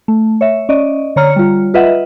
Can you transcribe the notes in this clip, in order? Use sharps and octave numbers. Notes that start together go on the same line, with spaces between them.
A3
C#5 E5
C#4 D5 D#5
D3 C#5 A#5 F6 C#7
G3 F4
F4 B4 D#5 E5 F#5